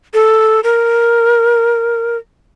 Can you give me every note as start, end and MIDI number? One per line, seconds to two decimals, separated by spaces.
0.14 0.60 69
0.64 2.17 70